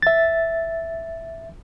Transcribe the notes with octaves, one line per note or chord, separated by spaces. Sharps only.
E5 A6